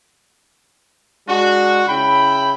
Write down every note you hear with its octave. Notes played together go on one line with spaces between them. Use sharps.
G#3 D4 F#4
C#3 E4 G5 B5